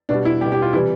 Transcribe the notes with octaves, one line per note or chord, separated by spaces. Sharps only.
B2 G3 D4
E4
B2 G3 G4
G4
F4
C3 E3 G3 E4